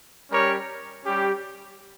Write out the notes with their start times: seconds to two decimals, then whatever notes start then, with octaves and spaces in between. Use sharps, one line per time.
0.30 G3 C#4 G4 A#4 C#5
1.05 G3 C#4 G4